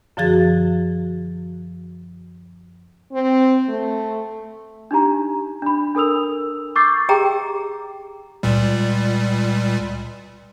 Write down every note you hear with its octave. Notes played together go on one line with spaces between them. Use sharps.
F#2 D3 F3 F#4 G#4 A6
C4
A3
D4 D#4 G4 A#5
D4 B5
D4 A4 A#4 D#6 E6 F7
C#6 D6 E6 G6 A6 C7
G4 G#4 G5 A#5
C#2 A#2 G3